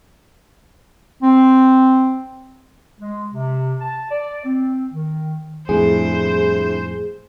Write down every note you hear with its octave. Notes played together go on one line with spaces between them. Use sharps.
C4
G#3
C3
A5
D5
C4
D#3
F2 A2 G3 D4 E4 G#4 C5